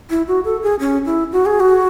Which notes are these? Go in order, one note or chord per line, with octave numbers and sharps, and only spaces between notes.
E4
F#4
A4
G#4
C#4
E4
F#4
G#4
F#4